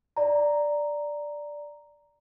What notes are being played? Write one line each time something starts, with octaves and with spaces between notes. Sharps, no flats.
D5 A#5